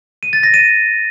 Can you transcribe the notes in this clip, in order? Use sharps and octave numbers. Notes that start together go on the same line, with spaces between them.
D#7
A6
A#6
D#7